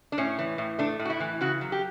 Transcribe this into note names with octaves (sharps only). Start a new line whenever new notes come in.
D4
A2 C#4
E3
A2
A3 D4
A2
F#4
E4
E3
C#3 F#4
F#3
G4